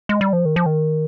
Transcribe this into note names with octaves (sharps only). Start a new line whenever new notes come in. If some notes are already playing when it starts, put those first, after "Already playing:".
G#3
G3
F3
D#3
F3
D#3